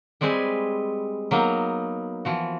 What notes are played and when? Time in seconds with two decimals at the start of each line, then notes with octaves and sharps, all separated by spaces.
0.21 G3 G#3 C4 B4 G#5
1.31 F#3 A#3 B3 D#4
2.25 E3 F3 F#4